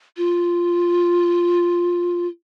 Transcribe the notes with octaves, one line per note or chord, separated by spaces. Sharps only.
F4